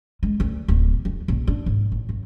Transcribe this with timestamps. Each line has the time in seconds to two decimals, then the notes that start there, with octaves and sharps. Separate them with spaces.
0.23 G#3
0.40 D2
0.68 D1
1.05 F2
1.28 A#1
1.48 D4
1.66 G#2
1.92 A1
2.09 F#2